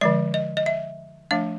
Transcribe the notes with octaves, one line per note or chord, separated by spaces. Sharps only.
D3 F3 G#3 D5
D#5
D#5
E5
F3 A3 D4 F5